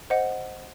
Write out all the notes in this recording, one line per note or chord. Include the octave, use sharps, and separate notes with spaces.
C5 D#5 F#5